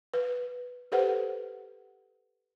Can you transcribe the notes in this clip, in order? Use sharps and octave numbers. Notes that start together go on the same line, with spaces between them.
B4
G4 A4 B4 C5 F#5